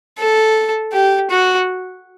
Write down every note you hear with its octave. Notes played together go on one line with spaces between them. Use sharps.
A4
G4
F#4